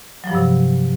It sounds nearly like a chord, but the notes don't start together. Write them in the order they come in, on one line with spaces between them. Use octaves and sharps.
F#3 F3 G2 C3